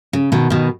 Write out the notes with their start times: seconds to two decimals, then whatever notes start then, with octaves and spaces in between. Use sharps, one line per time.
0.13 C#3
0.32 B2 D#3
0.50 B2 D#3